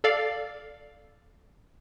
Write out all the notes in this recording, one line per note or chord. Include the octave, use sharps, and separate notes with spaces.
A4 D5 F5